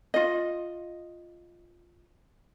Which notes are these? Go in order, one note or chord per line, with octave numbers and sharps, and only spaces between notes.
F4 D#5